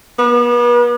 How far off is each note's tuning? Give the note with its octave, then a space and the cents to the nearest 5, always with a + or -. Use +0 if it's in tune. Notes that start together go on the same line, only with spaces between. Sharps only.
B3 -40